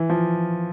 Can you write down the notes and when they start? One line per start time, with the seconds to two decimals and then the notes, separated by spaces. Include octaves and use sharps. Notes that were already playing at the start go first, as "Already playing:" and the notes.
Already playing: E3
0.09 F3